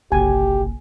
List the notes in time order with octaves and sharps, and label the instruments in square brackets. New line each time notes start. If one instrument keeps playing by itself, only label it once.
[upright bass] F#1 C3 [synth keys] B1 [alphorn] G4 [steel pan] G#5